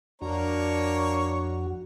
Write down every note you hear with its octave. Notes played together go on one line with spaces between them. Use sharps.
F2 A#3 D4 F#4 C#5 A#5